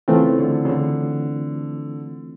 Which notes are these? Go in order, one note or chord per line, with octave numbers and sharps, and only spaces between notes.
C#3 E3 A3 C4 F4
D3
C#3
D3